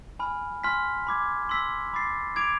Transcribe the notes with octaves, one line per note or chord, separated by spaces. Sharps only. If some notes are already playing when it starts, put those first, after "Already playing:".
G#5 B5 F6
G#5 C6 F6 B6
B5 D6 G#6
C6 E6 B6
B5 D6 A6 C7
D6 G#6 D7 F7